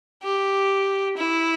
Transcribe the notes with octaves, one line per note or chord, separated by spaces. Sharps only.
G4
E4